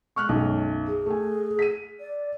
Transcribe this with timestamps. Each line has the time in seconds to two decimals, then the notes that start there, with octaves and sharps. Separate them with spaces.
0.16 G#3 C#6 F6 F#6
0.28 B1 F#2
0.87 G#4
1.06 A3 G#5
1.59 B6 D#7
2.00 D5